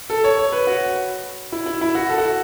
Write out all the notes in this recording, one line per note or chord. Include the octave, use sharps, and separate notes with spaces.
A4
C#5
C#5
B4
F#4
E4
E4
E4
F#4
A4
F#4